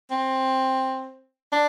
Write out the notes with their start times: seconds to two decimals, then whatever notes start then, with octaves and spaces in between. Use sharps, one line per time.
0.11 C4
1.52 D4